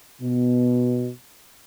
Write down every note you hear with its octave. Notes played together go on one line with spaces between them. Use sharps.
B2